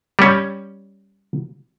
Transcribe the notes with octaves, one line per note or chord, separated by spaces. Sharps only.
G3 C#4